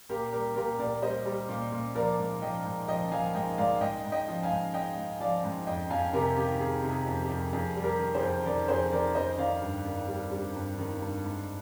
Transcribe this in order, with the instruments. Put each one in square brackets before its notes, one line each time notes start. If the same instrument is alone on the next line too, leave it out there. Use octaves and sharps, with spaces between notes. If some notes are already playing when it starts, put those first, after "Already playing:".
[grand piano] A#2 G4 A#4
G3 G4 A#4
A#2 G4 A#4
A#2 A#4 D5
G3 C5 D#5
G3
A#2
A#2
F3 A#4 D5
G#2
F3 D#5 G5
G#2
F3 D#5 G5
F3 F5 G#5
G#2 D#5 G5
G#2 D5 F5
G#2 D#5 G5
G#2
D#5 G5
F3
F5 G#5
G#2
G#2 D#5 G5
G#2
F3 D5 F5
G#2
F2 D#5 G5
F2 F5 G#5
C3 G4 A#4
D#3 G4
D#3 G#4
C3
G#4
F2
G4
F2
F2 G#4
G3
G4 A#4
D#3
G#4 C5
F2
D#3 A#4 D5
F2 G#4 C5
D#3 A#4 D5
F2 C5 D#5
D#3 D5 F5
G2
D#3
G3
G3
G2
D#3
G2
G#2